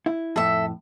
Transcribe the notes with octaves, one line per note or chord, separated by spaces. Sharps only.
E4
F2 A2 A4 E5